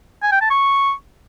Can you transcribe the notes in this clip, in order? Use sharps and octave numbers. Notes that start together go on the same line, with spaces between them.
G#5
G5
A5
C#6